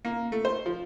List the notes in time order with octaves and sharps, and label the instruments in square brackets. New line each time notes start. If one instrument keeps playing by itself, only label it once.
[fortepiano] A#3
A3
C5
F3